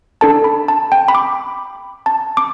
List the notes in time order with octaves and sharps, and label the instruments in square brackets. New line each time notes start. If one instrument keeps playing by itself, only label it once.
[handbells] D4 A4 A5
B5
A5
G5
B5
D6
A5
D6